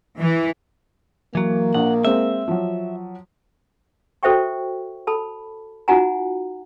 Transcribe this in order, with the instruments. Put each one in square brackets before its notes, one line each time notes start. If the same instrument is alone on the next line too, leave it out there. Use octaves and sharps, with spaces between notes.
[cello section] E3
[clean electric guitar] E3 F#3 [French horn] A#3
[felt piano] A#1 [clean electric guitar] F#5
[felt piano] G#3 C4 [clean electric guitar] E5
[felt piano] F3 F#3
[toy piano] F#4 A4 C5 E5 G5 C#6
A4 A5 B5
D#4 F4 F#4 F#5 G#5 A#5